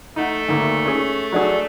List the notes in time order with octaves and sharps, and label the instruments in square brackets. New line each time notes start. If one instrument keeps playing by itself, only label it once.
[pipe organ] A3 A4 [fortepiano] D#4 F#5
[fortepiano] D2 D#3 A#3
C#4 G#4
F#3 D4 G#4